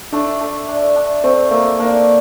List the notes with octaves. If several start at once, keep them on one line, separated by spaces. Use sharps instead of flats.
A3 D4
A3
D4
D4
A3 C4
A3 A#3
A#3 D4